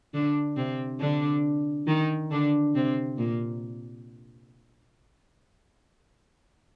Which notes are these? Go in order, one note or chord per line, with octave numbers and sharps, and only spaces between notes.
D3 D4
C3 C4
D3 D4
D#3 D#4
D3 D4
C3 C4
A#2 A#3